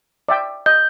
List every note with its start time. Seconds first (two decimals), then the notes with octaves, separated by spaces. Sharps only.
0.28 D5 E5 G5
0.66 D#5 G6